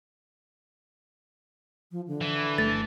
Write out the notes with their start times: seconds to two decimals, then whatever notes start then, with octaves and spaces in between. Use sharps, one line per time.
1.91 F3
2.07 D3
2.21 E3
2.58 G1 A3 A6